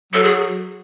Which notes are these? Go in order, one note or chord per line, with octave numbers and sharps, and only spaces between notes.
F#3 A4
G#4